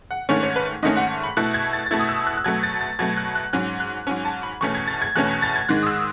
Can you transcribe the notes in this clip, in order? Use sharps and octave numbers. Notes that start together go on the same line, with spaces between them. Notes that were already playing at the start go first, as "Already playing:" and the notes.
F#5
G#2 D#3 A3 C#4 C#5
C#5
B4
G#2 D#3 A3 C#4 D#5
F#5
B5
B2 A3 E4 F#6
G#6
A6
A6
B2 A3 E4 G#6
D#6
E6
F#6
F#6
B2 F#3 A3 G#6
A6
A6
B2 F#3 A3 G#6
F#6
F#6
G#2 F#3 C#4 F#6
F#6
G#2 F#3 C#4 G#5
A5
B5
E2 B2 A3 C#4 C#6
G#6
A6
G#6
E2 B2 A3 C#4 F#6
A6
G#6
G#2 D#3 G#3 F#6
D#6
E6